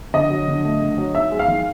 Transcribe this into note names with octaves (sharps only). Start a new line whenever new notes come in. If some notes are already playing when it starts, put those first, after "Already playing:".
D3 D#5
F#3
D3
A3
D3
F#3
D#4 E5
G#3
F5
D#3